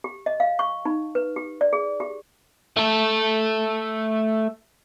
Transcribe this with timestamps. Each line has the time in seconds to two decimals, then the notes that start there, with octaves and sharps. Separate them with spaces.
0.04 G4
0.26 D#5
0.40 F5
0.59 C#6
0.85 D#4
1.15 B4
1.36 G4
1.61 D5
1.73 G#4
2.00 G4
2.77 A3 A4